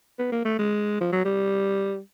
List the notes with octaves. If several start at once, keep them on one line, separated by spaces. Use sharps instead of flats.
B3
A#3
A3
G#3
F3
F#3
G3